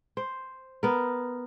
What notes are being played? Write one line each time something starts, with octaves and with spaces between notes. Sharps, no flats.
C5
B3 A#4